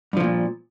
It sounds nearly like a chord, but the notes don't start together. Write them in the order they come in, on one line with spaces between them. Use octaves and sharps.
G2 F3 D3 A#2